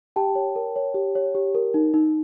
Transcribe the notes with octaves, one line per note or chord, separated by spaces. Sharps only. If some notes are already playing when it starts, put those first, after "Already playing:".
G4 G5 A5
C#5
A#4
C#5
G4
C#5
G4
A#4
D#4
D#4